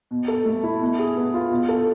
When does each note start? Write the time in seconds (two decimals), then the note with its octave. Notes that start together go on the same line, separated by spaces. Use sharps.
0.11 B2
0.28 A4
0.46 A3
0.63 E4
0.80 B2
0.99 G#4
1.16 B3
1.34 F4
1.51 B2
1.69 A4